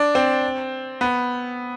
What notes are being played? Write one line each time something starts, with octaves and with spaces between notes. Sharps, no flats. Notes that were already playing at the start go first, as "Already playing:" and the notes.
Already playing: D4
C4
B3